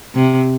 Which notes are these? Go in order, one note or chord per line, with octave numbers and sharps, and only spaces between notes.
C3